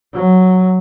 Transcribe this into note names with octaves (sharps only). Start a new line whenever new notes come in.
F#3